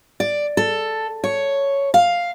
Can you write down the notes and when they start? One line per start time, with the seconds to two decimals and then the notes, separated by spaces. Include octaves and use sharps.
0.20 D5
0.57 A4
1.24 C#5
1.94 F5